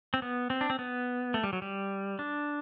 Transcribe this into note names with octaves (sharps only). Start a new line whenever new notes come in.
C4
B3
C4
D4
C4
B3
A3
G3
F#3
G3
D4